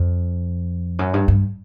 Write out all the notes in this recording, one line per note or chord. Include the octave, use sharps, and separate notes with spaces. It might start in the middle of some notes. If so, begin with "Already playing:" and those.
Already playing: F2
F#2
G2
G2